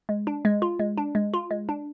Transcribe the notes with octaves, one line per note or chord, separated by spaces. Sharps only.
G#3
D4
G#3
F4
G#3
D4
G#3
F4
G#3
D4